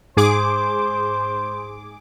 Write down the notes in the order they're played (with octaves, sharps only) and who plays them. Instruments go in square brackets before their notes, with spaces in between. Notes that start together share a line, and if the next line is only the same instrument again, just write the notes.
[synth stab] G#2 G#4 D6 [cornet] C5